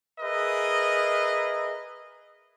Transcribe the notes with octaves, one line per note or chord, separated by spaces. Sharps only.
G#4 A#4 B4 D#5 E5